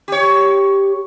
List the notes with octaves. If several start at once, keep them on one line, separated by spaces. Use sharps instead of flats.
G4 C#5